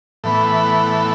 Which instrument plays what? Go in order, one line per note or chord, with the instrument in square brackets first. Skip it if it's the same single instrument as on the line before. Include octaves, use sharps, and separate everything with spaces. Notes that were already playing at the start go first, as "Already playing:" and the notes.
[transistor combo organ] A2 E3 B3